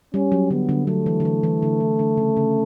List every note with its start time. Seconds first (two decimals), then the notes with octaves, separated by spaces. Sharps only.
0.14 G3 C#4
0.32 F#3
0.50 D3 B3
0.69 D3
0.87 F#3 A3
1.06 E3
1.20 D3
1.25 E3
1.43 E3
1.63 D3
1.80 E3
1.99 D3
2.17 C#3
2.37 C#3